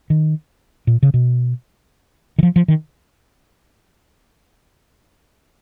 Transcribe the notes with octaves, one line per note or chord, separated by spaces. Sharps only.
D#3
A#2
C#3
B2
D#3
F3
F3
D#3